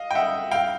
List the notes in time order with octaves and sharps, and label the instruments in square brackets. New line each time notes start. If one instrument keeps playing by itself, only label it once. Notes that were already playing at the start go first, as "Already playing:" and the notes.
Already playing: [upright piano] D#5 F5
G5
E5 F#5
F5 G5